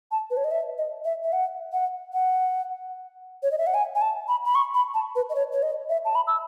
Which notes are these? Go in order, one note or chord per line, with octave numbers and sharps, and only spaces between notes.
A5
B4
C#5
D#5
E5
D#5
E5
E5
F#5
F#5
F#5
C#5
D#5
E5
F#5
G#5
G#5
A5
B5
B5
C#6
B5
A5
B4
D#5
C#5
C#5
D#5
E5
A5
B5
E6